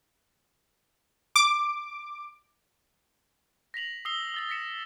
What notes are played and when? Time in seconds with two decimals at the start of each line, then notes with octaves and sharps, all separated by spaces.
1.36 D6
3.74 A#6 B6 F7 F#7
4.05 D#6 E6 C7 G7
4.34 E6 A6 G7
4.49 A#6 B6 C#7 E7